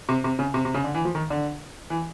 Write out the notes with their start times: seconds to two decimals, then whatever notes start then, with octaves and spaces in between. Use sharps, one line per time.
0.09 C3
0.24 C3
0.39 C#3
0.54 C3
0.65 C3
0.74 C#3
0.84 D3
0.95 E3
1.05 F3
1.15 D#3
1.30 D3
1.90 E3